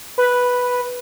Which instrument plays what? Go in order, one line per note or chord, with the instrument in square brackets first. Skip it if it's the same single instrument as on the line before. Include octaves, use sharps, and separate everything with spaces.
[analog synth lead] B4